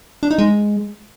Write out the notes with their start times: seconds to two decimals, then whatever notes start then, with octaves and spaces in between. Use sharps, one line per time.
0.23 D4
0.31 D#4
0.38 G#3